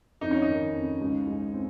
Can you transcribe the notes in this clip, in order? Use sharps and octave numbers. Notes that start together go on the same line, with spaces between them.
F2 D#4
C#4
D#4
D#3
F2
C#2
G#3
C4